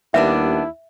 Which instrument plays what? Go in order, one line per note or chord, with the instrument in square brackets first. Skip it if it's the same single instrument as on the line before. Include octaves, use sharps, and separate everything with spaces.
[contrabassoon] D#2 [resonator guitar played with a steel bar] G3 B3 D4 [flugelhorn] E4 [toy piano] E5